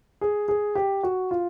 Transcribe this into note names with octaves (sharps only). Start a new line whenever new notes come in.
G#4
G#4
G4
F#4
F4